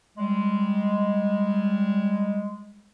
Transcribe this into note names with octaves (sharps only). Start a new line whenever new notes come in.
G3 G#3